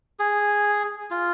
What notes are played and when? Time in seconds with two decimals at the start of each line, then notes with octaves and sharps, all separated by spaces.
0.20 G#4
1.11 F4